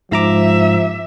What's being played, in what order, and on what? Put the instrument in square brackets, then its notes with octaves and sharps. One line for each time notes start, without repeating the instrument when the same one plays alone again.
[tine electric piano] G#2 A#5 D6 [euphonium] F3 [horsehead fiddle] E5